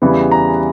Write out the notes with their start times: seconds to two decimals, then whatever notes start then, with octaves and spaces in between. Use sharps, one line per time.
0.02 E2 C#3 E3 G3 B3
0.31 A#5